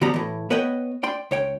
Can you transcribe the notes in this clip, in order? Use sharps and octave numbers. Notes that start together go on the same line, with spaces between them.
D3 F3 G3 B3 G4 A#5
A2 E3
B3 B4 C#5 D#5 F#5 G5
D5 G5 C6
C#2 C#5 G5